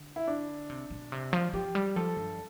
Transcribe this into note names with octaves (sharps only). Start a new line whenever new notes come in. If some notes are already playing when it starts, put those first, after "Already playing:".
Already playing: D3
E4
D4
C3
B2
C3
F3
F3 G4
G3
F3 A4
G2